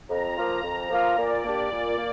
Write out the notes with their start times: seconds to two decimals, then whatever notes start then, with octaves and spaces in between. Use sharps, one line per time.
0.09 F2 A#5
0.37 F3 A#3 F4
0.63 F2
0.90 F3 A#3 F4
1.17 A#2 D5
1.43 A#3 D4 G4
1.71 A#2 D5
1.97 A#3